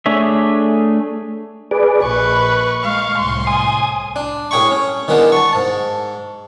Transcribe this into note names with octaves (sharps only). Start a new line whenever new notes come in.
A3 D4 G#4 C#5 E5
G#4 B4 D5
A#1 B4 C#6
G#3 F5
C2 A2 C6
G#5 D#6
D4
A2 G#4 G5 B5 C#6
C#4
D#3 E3 G#3 B3 D4
A5 C#6
G#2 A5